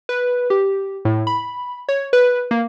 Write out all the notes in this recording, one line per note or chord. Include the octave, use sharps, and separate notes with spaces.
B4
G4
A2
B5
C#5
B4
A#3